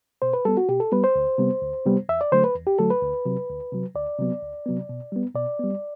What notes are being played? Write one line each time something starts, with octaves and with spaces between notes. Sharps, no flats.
B2 C5
B4
G3 B3 A4
F#4
B2 G4
A4
G3 B3 B4
C5
D2
C3 G3 B3
D2
C3 G3 B3
E2 E5
D5
D3 F#3 A3 C5
B4
E2
G4
D3 F#3 A3 A4
B4
D2
C3 F#3
D2
C3 F#3
D2 D5
C3 F#3 B3
D2
C3 F#3 B3
B2
G3 B3
B2 D5
G3 B3